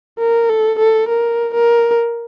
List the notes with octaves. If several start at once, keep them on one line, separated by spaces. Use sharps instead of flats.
A#4
A4
A4
A#4
A#4